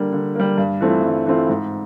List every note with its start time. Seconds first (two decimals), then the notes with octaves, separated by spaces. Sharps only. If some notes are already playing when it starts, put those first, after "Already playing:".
Already playing: D3 G3 A#3
0.12 D3
0.35 G3 A#3
0.58 G2
0.81 E3 A3 C4 F4
1.04 G2
1.26 E3 A3 C4 F4
1.49 G#2